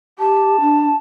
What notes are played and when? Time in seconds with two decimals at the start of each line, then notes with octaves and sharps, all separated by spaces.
0.19 G4 A5
0.61 D4